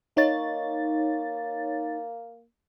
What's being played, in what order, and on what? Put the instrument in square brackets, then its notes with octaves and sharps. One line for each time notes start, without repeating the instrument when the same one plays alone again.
[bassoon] A#3 [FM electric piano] D#4 C#5 A6